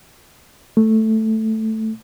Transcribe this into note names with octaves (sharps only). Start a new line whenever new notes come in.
A3